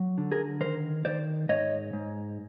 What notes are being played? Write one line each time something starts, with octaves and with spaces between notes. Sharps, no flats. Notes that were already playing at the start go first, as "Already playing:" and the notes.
Already playing: F#3
D3
G#4 A#4
D#3 A#4 C5
D#3 C5 D5
G#2 C#5 D#5
G#2